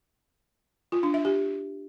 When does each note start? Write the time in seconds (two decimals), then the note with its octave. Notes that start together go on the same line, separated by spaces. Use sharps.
0.92 F4
1.03 D4
1.14 E5
1.25 G4